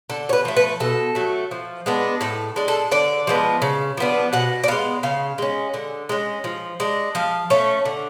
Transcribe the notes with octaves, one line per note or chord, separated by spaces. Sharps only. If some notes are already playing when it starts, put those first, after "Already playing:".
D3 A4
C#5
B4
F3 A3
B4
B2 A4
F#3 A3
F3
G#3 B3 D4
A2 A4
G#3 D4
A4
D3 D5
F3 G#3 B3
C#3
F3 B3 D4
B2 F#5
D5
G#3 B3 F5
C#3 F5
G#3 C#4
D3
G#3 C#4
F3
G#3 D4
F3 F5
A3 C#4
D3